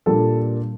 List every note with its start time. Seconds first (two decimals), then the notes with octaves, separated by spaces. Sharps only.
0.06 A#2 G3 A#3 D4 A4